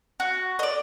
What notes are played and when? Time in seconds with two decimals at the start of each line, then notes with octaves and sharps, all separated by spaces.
0.20 F#4
0.59 D5 D#5